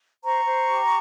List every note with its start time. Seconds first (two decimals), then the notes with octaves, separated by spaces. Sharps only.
0.24 C5 A#5 C#6
0.46 C5
0.68 G4